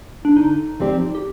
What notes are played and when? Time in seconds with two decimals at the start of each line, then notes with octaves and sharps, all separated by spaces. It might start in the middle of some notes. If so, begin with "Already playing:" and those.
0.25 D4
0.36 D3 D#4
0.80 F3 C4 G4 D5
1.15 G4